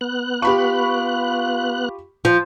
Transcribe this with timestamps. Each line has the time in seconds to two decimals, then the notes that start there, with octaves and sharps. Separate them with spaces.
0.01 B3 F#6
0.42 F4 G4 B5 C#6
2.25 F3